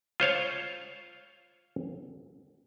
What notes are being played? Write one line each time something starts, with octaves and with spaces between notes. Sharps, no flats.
F4 C5 C#5 F5